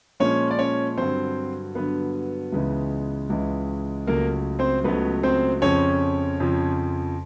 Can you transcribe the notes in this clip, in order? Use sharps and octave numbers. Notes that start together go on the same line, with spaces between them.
A#2 F3 G#3 C#4 C#5
D5
C#4 C#5
G2 D3 F#3 C4 C5
G2 D3 F#3 B3 B4
C#2 C#3 E3 G#3
C#2 C#3 E3 G#3
C#2 C#3 F#3 A3 A#3 A#4
C4 C5
C#2 C#3 F#3 A3 B3 B4
C4 C5
F2 C#3 F3 C#4 C#5
F2 C#3 F3